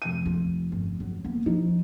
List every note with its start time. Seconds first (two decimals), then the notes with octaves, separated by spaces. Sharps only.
0.02 F1 D#7
0.25 F4
0.72 G1
1.00 F#3
1.24 A#3 B3
1.46 F3 D#4